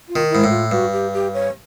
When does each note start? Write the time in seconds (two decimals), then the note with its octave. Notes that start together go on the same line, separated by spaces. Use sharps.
0.09 F4
0.16 D#3
0.30 G#2 E4
0.44 A2
0.50 F4
0.71 G2 F#4
0.93 G4
1.14 G4
1.34 C#5